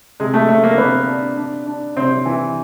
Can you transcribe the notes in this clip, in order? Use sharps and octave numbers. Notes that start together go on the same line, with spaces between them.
C3 G#3
A3
C3 A3
A#3
C3 B3
D4
D4
D4
C3 C4
E3